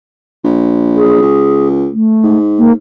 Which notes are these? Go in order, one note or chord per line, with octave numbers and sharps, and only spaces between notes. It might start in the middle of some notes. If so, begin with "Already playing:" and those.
A#1
G#4
C#2
A3
G#2
A#3